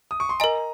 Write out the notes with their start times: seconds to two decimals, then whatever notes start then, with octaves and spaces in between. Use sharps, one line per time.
0.11 D#6
0.20 C#6
0.29 C6
0.40 A#4 D#5 G#5 A#5